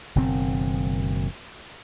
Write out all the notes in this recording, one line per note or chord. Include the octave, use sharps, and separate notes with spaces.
F#1 B2 D#3 C4